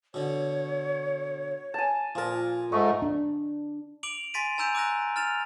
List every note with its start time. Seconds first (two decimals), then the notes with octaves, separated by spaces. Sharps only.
0.14 B2 D3 C#5
1.74 G#5 A5
2.15 A#2 F3 A#4 A5
2.72 G#2 A3 D#5 C#6
3.02 D4
4.03 D6 D7 F7 F#7
4.34 G#5 C6 A6 B6 D7 D#7
4.58 G#5 A#5 E6 G6 D7 F7
4.75 D6 E6 F#6 A#6
5.16 F6 A6 E7 F7